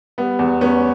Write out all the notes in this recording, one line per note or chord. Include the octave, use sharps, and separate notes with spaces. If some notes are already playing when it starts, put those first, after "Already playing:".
G3 B3
E2
E2 B3 C#4